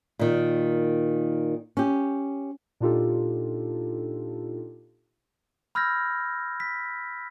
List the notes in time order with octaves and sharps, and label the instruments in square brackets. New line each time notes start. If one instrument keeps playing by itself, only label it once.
[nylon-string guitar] A#2 D#3
C#4 G4
[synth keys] A#2 D4 D#4 F4 G4 A4
[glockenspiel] B5 E6 F6 G6 G#6 A#6
B6